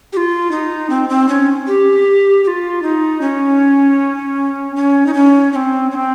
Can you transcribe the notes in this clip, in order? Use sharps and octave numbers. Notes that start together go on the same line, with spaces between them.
G4
F4
D#4
C4
C4
C#4
G4
G4
F4
D#4
C#4
C#4
D#4
C#4
C#4
C4
C#4
C4